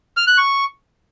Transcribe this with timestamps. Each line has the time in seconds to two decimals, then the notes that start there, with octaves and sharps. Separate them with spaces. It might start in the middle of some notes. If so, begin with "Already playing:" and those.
0.17 F6
0.27 F#6
0.38 C#6